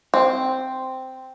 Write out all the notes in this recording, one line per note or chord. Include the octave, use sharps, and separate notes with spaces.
C4